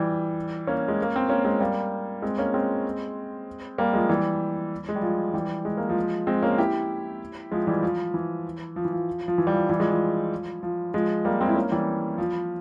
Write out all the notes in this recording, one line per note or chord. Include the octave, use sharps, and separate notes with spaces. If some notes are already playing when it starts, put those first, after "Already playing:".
Already playing: E3 G3
A#3 C#4
G#3
A#3
C4
A#3 C#4
G#3 C4
G3 A#3
G#3 C4
A#3 C#4
G#3 C4
G3 A#3
F3 G#3
E3 G3
G#3
G3
F3
E3 G3
G#3
A#3
F3 G#3
G#3 C4
A#3 C#4
E4 G4
F3 G#3
E3 G3
F3
E3
F3
E3
F3
F3
E3
G3
F3
E3 G3
F3 G#3
F3
F3
F3 G#3
G3 A#3
G#3 C4
E4
A#3 C#4
E3 G3
F3